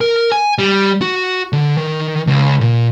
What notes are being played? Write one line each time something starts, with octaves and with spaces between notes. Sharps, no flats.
A#4
G#5
G3
F#4
D3
D#3
C#2
A#2